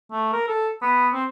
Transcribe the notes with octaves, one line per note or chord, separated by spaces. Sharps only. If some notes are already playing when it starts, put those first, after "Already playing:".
A3
A#4
A4
B3
C4